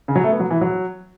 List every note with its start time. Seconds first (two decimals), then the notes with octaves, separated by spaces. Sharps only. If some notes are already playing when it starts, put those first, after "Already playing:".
0.08 C#3
0.16 F#3
0.24 A3
0.32 B3
0.40 F#3
0.51 E3
0.61 F#3